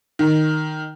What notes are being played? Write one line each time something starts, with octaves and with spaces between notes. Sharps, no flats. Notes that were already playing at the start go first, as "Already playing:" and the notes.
D#3